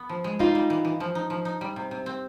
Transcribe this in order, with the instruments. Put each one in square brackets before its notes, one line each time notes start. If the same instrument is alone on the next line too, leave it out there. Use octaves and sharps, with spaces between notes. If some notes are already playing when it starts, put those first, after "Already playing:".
Already playing: [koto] B3
F3
G#3
[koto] G3 [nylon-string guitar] D#4 F4
[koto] G3
E3
E3
F3
D#4
F3
D#4
G3
C3
C3
C4